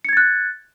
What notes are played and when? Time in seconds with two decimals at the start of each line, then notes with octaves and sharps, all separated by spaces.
0.05 C#7
0.09 G#6
0.13 A6
0.17 F#6